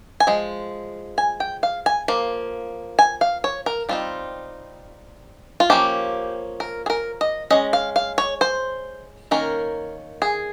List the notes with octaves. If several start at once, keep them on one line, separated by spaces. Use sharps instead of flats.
G#5
F3 G#3
G#5
G5
F5
G#5
F3 A#3
G#5
F5
C#5
A#4
G3 C4 D#4 F4
F4
F3 A#3 C#4 G4
A#4
G#4
A#4
D#5
G#3 C#4 D#5
F5
F5
C#5
C5
D#3 A#3 C#4 A#4
G#4